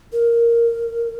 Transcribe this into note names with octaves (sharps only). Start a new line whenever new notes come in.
A#4